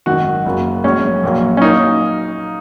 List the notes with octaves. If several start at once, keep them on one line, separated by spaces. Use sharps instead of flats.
G#1 F#2 D#3 F#4
F#1 F#2 F#3 A#3
A#1 G#2 F#3 C#4
A#1 A#2 F#3 A#3
C#4
F#3 A#3 D#4